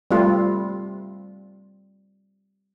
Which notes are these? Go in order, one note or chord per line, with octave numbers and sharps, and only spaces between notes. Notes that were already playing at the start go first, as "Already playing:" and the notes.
G3 A3 C4 F4